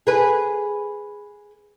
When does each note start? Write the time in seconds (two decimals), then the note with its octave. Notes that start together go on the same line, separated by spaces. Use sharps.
0.07 G#4 B4